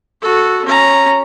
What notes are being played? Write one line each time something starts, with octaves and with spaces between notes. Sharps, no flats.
F#4 A4
C#4 A#5